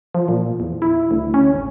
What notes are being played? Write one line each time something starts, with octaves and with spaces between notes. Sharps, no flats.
F3
A#2
E2
E4
D2
C#4
G#1